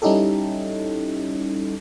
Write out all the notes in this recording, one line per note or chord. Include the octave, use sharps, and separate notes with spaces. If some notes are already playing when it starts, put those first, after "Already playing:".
G3 C#4 D#4 E4 G4 A4